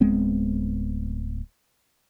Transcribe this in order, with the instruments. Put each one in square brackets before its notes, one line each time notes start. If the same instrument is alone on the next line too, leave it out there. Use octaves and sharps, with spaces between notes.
[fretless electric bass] D1 G#3 B3 C4